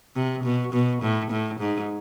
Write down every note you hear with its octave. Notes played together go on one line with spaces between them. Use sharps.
C3
B2
B2
A2
A2
G#2